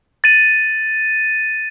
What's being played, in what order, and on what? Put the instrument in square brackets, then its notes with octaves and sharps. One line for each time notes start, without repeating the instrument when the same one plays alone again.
[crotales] A6 D#7